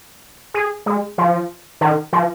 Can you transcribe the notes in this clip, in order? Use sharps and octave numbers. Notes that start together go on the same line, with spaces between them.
G#4
G#3
F3
D#3
F3